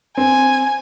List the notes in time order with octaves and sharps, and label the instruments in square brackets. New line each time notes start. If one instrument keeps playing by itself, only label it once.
[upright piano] C4 [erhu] G#5